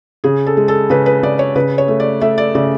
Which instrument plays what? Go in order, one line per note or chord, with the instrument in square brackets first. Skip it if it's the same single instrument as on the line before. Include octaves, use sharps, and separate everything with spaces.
[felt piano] C#3 G#4
A4
G#3
A4
C#3 B4
B4
C#3 D5
C#5
C#3 B4
C#5
A3
D5
A3 E5
D5
C#3 D5